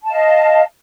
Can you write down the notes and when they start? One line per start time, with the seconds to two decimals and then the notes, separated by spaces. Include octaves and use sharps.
0.03 A5
0.07 F5
0.11 D#5